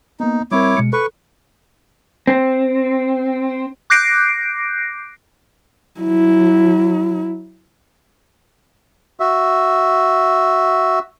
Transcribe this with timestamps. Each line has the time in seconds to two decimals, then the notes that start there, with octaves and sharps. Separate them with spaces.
0.20 A#3 B3 D#4
0.52 G3 C4 E4 A#4 C#5 D6
0.77 B2 G#3 C#7
0.93 A4 B4 C#6
2.27 C4
3.90 D6 F#6 G6 A#6 C7 D7
6.00 F#3 E4
9.20 F#4 E5